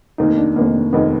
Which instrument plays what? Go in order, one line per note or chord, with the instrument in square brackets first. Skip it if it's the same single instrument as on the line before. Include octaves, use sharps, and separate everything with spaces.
[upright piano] F1 D#2 D#3 A#3 [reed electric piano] D#4
[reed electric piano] D4
[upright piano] F1 D#2 D#3 A#3 [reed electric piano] B3
[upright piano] F1 D#2 D#3 A#3 [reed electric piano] B3